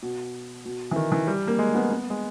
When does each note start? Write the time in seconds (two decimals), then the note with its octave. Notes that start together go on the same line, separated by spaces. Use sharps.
0.03 B2
0.65 B2
0.91 E3
0.96 D#3
1.12 E3
1.27 G3
1.47 A#3
1.59 G#3
1.75 B3
1.90 B3
2.10 G#3